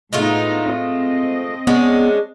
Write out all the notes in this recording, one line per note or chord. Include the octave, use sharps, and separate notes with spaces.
A2 G#3 A3 B3 D#4 F4
C4 D#5
G#3 B3 C#4 D4